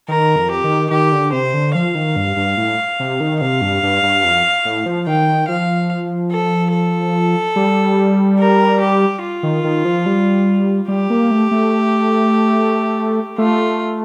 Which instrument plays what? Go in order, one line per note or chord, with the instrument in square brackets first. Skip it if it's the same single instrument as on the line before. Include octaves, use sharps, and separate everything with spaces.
[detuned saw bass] D#3 [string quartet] A#4
[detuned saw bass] F2
[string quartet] G4
[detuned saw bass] D#3
[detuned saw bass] D#3 [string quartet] G4
[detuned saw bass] D3
[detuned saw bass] C3 [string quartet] C5
[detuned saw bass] D3
[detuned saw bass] F3 [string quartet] F5
[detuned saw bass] D#3
G2
G2
A2
C3
D#3
[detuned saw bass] C3 [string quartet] F5
[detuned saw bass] G2
G2
G2
F2
A2
F3
[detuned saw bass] D#3 [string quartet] G5
[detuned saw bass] F3 [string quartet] F5
[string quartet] A4
A4
[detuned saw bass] G3
[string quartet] A#4
G4
F4
[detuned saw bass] D#3
D#3
F3
G3
[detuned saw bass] G3 [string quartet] G4
[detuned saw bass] A#3
A3
A3
[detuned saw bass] A3 [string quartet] F4